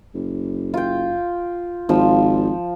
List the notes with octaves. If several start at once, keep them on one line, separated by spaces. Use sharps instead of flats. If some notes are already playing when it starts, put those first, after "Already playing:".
F#1
F4 G5
G#1 F3